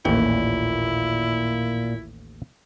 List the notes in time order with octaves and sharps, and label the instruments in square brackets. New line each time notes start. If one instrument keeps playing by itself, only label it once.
[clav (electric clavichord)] A1 D#2 G5 [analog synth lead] A#2 [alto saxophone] E4